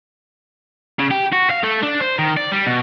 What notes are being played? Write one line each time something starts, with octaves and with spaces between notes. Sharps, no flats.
C#3
G4
F#4
F5
A3
D4
C5
D#3
D5
G3
B2